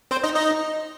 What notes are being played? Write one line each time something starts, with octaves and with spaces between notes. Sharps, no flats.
C4 C5
D#4 D#5
D#4 D#5